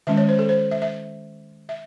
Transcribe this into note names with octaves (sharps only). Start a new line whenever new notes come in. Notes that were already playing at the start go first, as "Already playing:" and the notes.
D#3 G#3 C#4 E5
C#5
C5
A4
C5
E5
E5
E5